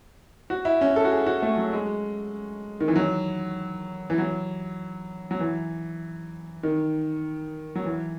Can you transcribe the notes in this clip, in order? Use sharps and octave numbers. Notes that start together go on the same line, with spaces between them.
F#4
E4
C#4
A4
F#4
G#4
F#4
A3
F#3
G#3
D#3
E3
F#3
E3
F#3
F#3
E3
D#3
F#3
E3